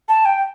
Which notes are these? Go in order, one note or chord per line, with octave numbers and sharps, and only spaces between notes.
A5
G5